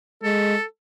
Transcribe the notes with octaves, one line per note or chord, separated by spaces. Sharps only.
G#3 A4